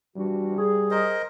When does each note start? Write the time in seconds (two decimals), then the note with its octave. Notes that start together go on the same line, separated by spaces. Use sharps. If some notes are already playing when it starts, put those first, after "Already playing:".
0.16 E3 G3 D4 F#4
0.58 G#4
0.91 A#4 C5 D#5